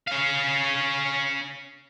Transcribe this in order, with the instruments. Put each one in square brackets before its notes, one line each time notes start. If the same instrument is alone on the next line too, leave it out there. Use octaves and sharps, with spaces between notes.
[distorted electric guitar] C#4 F5